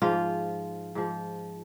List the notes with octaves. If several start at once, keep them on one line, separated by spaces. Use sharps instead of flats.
G#2 F3 F4
G#2 F3